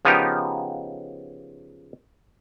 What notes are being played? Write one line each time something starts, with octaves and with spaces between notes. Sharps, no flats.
C#3 F3 B3 D#4 G4 A#4